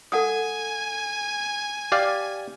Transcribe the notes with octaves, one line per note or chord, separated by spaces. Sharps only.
A4 F#5 G#5 D#6
G4 D5 F5